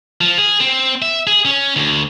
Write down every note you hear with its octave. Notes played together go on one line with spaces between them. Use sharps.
F3
G#4
C4
E5
G#4
C#4
D2